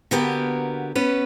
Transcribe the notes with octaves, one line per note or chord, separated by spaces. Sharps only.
D3 A#3 B3 F#4 G4 A#4
B3 C#4 B4